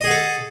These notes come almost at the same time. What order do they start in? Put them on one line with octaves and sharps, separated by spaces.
D#5 G#4 F#5 A4